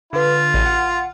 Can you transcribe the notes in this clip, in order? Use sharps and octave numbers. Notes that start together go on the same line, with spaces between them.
D3 F4 B4
A1 D#7
F#5